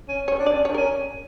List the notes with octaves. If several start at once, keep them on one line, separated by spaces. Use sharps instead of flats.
C#4
C#4 C#5
D4
D5
C#4
D4 C#5
A#4
C#4